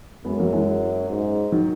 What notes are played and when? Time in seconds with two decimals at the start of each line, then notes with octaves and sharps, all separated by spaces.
0.25 F#2 G#3 B3
0.39 F#3 A#3
0.53 E3 G#3
1.09 G#2
1.52 D#3 F#3